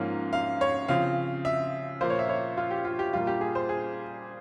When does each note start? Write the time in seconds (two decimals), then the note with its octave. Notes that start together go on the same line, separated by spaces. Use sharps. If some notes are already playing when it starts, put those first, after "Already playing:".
Already playing: G#2 F3 A#3 C#4
0.33 F5
0.61 C#5
0.88 C#3 F3 C4 F5
1.45 E5
2.01 A#2 F3 A#3 C5
2.10 C#5
2.19 E5
2.29 C#5
2.57 F4
2.71 G4
2.85 F4
2.99 G4
3.13 A#2 G3 A#3 F4
3.27 G4
3.41 G#4
3.55 C5
3.69 G#4